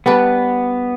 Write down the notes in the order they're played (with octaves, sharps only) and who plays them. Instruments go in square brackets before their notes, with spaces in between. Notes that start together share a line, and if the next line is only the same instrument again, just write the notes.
[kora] G3 D4 B4 [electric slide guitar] B3